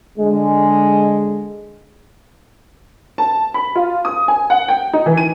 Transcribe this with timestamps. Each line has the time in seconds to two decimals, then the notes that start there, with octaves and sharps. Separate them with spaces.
0.17 D3 G#3
3.18 A5
3.54 B5
3.75 F4
4.05 D#6
4.28 G#5
4.50 F#5
4.68 G5
4.93 D#4
5.06 E3
5.17 D#7